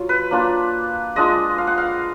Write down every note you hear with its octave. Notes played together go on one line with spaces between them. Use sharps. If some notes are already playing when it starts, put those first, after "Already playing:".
Already playing: F#3 F4
B4
A#3 D4 F4
G#3 D4 F4 D#5
F5
F#5
F5